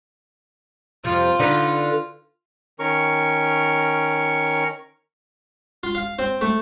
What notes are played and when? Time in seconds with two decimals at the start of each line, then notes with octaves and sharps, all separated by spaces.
1.04 F2 C3 F4
1.39 D3 D#4 B4
2.79 D#3 C#4 A#4 C#6
5.83 F4
5.95 F5
6.19 C4
6.41 A3